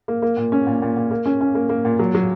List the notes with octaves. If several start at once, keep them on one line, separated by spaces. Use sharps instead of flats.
A#3
A#3
A#2
C#4
A#2
A#2
A#2
A#3
C#4
C#4
A#3
A#3
A#2
F#3
F#3